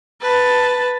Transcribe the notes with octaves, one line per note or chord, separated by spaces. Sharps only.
B4 A5